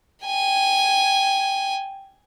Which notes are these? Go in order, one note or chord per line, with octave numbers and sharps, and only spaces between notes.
G5 G#5